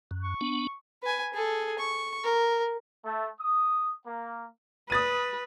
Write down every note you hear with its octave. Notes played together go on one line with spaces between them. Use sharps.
F#2
C#6
B3 D4
B4 G#5
G#4 A4
C#6
A#4
A3
D#6
A#3
B4 D#6 A6 D#7